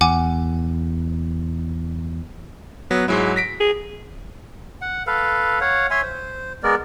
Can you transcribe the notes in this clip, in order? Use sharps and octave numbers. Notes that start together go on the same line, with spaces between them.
E2 F#5 G#5 D6
F#3 B3
G#2 F#3 G#3 E4
A#6 B6 D7
G#4
F#5
A4 B4 F5
C#5 F5 F#5
C#5 E5 G#5 C6
C5
G#3 B3 A#4 D5